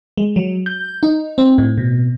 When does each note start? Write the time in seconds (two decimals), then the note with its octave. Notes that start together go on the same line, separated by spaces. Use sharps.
0.17 G#3
0.36 F#3
0.66 G6
1.03 D#4
1.38 C4
1.58 A2
1.78 B2